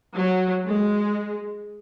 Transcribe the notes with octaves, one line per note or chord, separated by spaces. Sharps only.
F#3
G#3